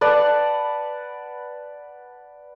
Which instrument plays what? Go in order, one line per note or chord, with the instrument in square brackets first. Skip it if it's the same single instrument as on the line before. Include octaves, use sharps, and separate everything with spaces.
[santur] B4 D5 F#5 A5